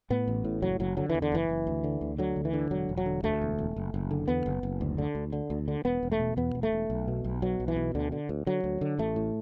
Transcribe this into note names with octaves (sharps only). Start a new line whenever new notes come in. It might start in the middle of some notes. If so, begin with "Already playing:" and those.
A2 B3
A1
A2
F#1 F#3
F#1 F#3
D3 F#3
E3
E2
D3
F#1 E3
F#1
D2
D3
D2
D3 F#3
D2
E3
D3
E1 F#3
E1
F#3
D3
D2 A3
E1
E1
F#1
F#1
D3
E2 B3
F#1
F#1
D2
D3
D2
D3
D2
D3
E1 B3
E1
A3
B2
E2 B3
E1
A3
E1
B1
B2
B1
B2 F#3
B1
E3
B2
D2 D3
D3
D2
D3 F#3
D2
D3
A1 A3
A2